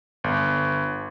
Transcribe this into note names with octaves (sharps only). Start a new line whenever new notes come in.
G1